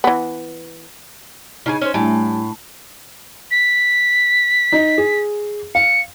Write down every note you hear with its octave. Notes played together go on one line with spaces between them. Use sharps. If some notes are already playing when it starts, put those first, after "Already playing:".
E3 B3
C#3 D#4 A4 G#5
C#4 C5
A2 G3 A3 D4 E4 G#5
B6
D#4
G#4
F5 C#7